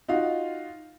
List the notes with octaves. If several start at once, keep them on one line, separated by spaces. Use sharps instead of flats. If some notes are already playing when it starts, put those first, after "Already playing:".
D#4 F4 F#4 F5